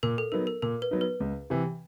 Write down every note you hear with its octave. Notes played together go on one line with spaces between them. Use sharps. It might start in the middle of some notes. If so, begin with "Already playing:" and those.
A#2 A#4
A4
F#3 B3 D#4 A#4
A#4
A#2 A#4
B4
F#3 B3 D#4
B4
C#2
C3 E3